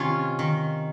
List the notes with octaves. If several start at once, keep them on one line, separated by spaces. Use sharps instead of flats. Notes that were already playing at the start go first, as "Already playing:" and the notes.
Already playing: C3 D#3 C#4 F4
D#3